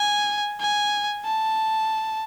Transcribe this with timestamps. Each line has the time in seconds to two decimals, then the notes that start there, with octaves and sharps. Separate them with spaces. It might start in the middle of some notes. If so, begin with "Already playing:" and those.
Already playing: G#5
0.60 G#5
1.26 A5